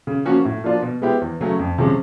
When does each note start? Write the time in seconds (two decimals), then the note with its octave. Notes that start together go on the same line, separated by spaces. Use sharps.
0.07 C#3
0.25 F3 A#3 C#4 F#4
0.45 A2
0.64 F3 A#3 D4 F4
0.82 B2
1.02 G#3 B3 E4 G4
1.21 E2
1.40 C#3 F#3 A3 C#4
1.59 F2
1.78 C3 F3 G#3 C#4